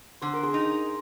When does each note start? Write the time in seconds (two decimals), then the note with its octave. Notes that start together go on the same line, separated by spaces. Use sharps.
0.22 D3 C5
0.33 A#4
0.43 G#4 C5
0.54 D#4